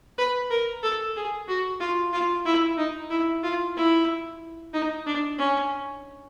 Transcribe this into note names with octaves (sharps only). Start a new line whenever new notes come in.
B4
A#4
A4
G#4
F#4
F4
F4
E4
D#4
E4
F4
E4
D#4
D4
C#4